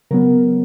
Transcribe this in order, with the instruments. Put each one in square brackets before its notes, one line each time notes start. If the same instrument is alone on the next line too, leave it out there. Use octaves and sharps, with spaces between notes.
[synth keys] C#3 F#3 B3 A#4